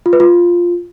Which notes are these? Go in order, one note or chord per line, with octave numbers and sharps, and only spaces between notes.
F4
B4
F4